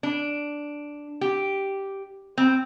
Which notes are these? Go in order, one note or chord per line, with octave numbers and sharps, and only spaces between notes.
D4
G4
C4